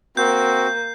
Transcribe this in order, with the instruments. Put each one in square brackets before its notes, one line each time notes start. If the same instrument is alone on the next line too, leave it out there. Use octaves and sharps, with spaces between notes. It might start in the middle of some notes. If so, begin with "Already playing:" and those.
[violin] A#3 [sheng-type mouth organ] C4 F#4 [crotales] G6 C7